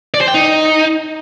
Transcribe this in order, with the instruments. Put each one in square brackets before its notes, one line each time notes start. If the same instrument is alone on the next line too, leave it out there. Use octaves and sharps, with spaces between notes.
[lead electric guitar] D5
C5
G5
D#4